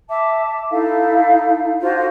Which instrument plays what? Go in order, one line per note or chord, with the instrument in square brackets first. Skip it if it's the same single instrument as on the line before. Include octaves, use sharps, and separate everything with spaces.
[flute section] E5 A5 D6
D#4 E4 A4 F5
D4 F4 F#4 C5